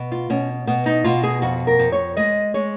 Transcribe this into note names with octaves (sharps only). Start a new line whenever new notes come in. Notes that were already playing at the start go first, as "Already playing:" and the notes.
Already playing: B2
F4
B2 C#4
B2 B3
D#4
B2 F4
G#4
F2 F#4
A#4
F2
C#5
G#3 D#5
G#3 C#5